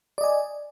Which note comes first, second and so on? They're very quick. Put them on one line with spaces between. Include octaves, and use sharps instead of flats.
D5 D#5 G#5